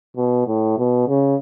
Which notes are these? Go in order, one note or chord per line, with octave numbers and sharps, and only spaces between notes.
B2
A2
B2
C#3